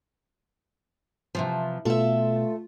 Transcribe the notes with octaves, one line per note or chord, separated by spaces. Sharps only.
C3 E3 F3 A5
B2 A3 F4 A4 E5